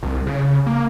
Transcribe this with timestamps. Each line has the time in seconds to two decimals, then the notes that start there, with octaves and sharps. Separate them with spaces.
0.03 C2
0.27 C#3
0.67 A#3